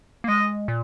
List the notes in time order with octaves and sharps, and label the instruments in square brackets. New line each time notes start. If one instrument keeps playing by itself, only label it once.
[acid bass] A#3
[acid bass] G#3 [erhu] D#5
[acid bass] A#2